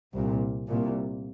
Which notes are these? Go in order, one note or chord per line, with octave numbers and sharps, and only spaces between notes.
C2 A#2
C2 A#2